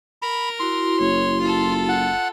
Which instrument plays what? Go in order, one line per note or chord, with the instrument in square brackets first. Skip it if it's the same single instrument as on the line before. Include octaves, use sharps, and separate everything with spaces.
[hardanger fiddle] A#4 [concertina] B5
[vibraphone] E4 F#4 [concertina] C6
[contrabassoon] F#1 [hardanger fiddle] C#5
[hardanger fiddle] F4 A4
[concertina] F#5